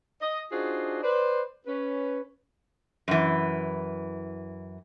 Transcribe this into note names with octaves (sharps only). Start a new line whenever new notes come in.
D#5
D4 D#4 F4 F#4 G#4 C5
B4 C5 D5
C#4 B4
F#2 E3